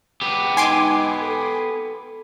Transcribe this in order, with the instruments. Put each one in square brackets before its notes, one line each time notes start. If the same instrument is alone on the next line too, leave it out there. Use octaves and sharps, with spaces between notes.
[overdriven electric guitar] B3 G4
[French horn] D#4 [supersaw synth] G#5 C6 D6
[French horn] A4